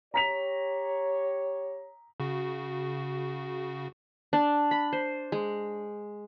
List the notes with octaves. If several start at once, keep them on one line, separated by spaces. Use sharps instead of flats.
G4 C#5 A#5 B6 F7
C#3 F#4
D4
B5
C5
G#3